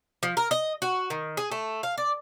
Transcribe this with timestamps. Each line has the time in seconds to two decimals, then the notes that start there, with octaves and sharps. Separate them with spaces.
0.23 F3
0.37 A#4
0.51 D#5
0.82 F#4
1.10 D#3
1.37 G#4
1.51 A3
1.83 F5
1.98 D5